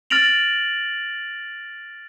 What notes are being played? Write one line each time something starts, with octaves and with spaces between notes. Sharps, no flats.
F6 A6 A#6 D7 F7 F#7